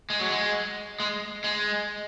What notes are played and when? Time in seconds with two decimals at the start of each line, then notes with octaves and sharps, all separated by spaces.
0.10 G#3
0.20 F#3
0.30 G#3
1.00 G#3
1.44 G#3